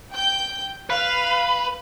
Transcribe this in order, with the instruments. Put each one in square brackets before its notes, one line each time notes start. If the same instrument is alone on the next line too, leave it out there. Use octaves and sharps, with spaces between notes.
[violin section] G5 G6
[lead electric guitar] B4 [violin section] F5